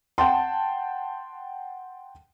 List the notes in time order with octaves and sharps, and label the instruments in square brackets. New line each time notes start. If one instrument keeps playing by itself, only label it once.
[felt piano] F#5 G5 A5 C6